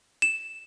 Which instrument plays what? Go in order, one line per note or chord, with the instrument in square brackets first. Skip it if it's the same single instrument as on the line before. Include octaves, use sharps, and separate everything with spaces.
[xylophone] E7